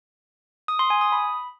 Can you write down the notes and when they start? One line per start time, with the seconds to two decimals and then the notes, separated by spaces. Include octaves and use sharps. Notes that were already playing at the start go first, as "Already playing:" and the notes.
0.68 D#6
0.79 C6
0.90 G#5
1.01 D#6
1.12 B5